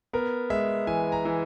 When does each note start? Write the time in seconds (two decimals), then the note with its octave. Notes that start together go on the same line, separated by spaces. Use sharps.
0.13 B3 A#4
0.50 G#3 E5
0.87 E3 G#5
1.12 A#5
1.25 E3